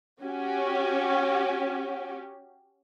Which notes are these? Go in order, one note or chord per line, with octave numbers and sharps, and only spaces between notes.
C#4 F#4 G4